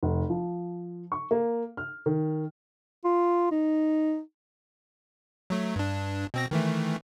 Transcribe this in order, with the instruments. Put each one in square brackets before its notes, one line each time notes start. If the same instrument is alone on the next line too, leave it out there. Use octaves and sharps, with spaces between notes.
[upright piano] F1
F3
C#6
A#3
F6
D#3
[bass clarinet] F4
D#4
[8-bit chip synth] F#3 A3
G2 D4
B2 C4 A#6
D#3 E3 A3